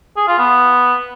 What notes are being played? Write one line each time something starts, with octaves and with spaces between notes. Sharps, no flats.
G#4
F4
B3